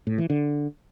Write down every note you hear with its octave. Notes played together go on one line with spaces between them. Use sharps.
A2
E3
D3